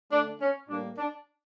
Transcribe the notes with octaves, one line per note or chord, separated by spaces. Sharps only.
D3 A3 D4
C#4
A2 G3 A#3 D4
D4